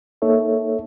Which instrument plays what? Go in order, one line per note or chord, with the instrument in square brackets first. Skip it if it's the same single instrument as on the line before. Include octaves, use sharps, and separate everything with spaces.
[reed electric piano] A#3 D#4 A4 C#5 E5